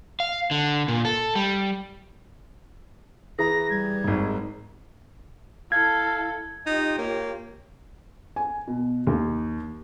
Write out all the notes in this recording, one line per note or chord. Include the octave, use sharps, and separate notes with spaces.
F5
D3
A#2
A4
G3
E3 G#4 A#5 A#6
G3 G#6
G#1 G#2
E4 A4 F5 G#6
D#4 F4 G4 D#5
A#3 C#5
G#5
B2
D#2